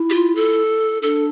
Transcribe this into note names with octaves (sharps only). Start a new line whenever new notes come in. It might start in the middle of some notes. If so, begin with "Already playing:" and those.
Already playing: E4
G4
F4
A4
D4 A4